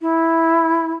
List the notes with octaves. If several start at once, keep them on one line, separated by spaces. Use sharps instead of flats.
E4